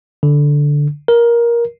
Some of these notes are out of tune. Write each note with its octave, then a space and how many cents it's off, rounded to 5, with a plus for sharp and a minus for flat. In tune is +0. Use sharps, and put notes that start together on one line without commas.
D3 -5
A#4 +15